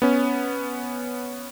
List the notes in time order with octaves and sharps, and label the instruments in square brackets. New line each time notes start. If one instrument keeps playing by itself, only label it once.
[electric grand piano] B3 C#4